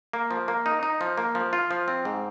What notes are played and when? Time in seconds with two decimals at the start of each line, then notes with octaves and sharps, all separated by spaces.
0.13 A#3
0.31 F3
0.48 A#3
0.66 D#4
0.83 D#4
1.01 F3
1.18 A#3
1.35 F3
1.53 F4
1.71 F3
1.88 C4
2.05 G#2